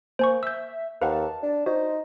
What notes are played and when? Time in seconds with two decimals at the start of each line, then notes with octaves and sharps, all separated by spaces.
0.19 A#3 C5 G#5 C#6
0.43 E5 E6 G6
1.02 D#2 B4 F5 F#5 A5
1.43 D4
1.66 D#4 F#4 C5